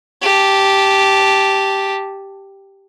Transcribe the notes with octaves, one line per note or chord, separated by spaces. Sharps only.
G4 A5